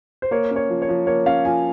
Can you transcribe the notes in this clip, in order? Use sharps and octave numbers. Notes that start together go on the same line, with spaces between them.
C5
A#3 C#5
C#4
C#5
F3
C#5
F3
A#3 C#5
C#4 F5
F3 G#5